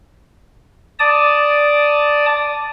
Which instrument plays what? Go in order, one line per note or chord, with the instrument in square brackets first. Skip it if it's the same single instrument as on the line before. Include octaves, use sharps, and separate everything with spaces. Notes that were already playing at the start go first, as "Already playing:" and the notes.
[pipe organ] D5 A5 D#6